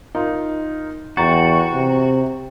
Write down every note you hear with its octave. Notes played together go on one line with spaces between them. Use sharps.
D#4 F4 A#4
E2 F#4 G5 A#5 A6
C3